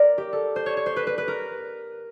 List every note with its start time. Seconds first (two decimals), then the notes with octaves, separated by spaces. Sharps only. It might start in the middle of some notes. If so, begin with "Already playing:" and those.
Already playing: A#4 D5
0.18 G4
0.33 A4
0.56 C5
0.66 C#5
0.77 C#5
0.86 C5
0.96 B4
1.07 B4
1.18 B4
1.28 A#4